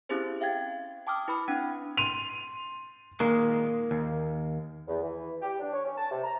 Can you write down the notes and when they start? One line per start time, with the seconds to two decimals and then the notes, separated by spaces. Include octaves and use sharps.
0.09 C4 C#4 E4 G4 G#4 C5
0.41 E5 F5 G5 G#6 A6
1.07 G5 A5 D6 D#6 F6
1.28 E4 B4 B5 D#6 F6
1.48 C4 D4 F#5 G5
1.97 C6 D#7 F7
3.20 A#2 D#3 G#3 A#3
3.91 D#2
4.88 E2
5.02 E3
5.42 G4
5.60 D4
5.72 C#5
5.84 C#4
5.97 A5
6.11 C3
6.23 A#5